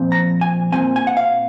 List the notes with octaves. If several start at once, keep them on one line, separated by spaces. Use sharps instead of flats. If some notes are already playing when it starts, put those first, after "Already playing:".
Already playing: A#2 F3 C4
A#5
G#5
A#2 F3 C4 G#5
G#5
F#5
F5